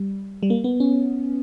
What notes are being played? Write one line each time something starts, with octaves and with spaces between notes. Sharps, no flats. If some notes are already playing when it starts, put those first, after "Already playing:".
Already playing: G3
G3
A#3
B3
C#4